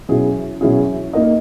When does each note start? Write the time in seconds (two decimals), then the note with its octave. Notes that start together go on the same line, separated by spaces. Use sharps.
0.09 B2 F#3 C#4 E4 G#4
0.61 B2 F#3 C#4 E4 G#4
1.13 A#3 D#4 A#4 D#5